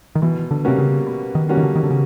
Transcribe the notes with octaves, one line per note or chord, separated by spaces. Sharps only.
D#3
B2 E3
D3
C3 G3 A#3 C#4 F#4
C#3
B2
D#3
G3 A#3 C#4 F#4
D#3
D3
D#3
D3
C#3